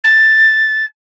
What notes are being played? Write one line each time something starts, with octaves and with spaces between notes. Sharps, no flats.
A6